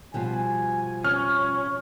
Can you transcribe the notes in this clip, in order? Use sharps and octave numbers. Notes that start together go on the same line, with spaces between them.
B2 F3 G3 G#5
C#4 F6